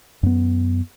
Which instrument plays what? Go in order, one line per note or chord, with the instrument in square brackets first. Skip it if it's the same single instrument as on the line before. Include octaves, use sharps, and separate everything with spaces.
[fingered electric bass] F#2 B3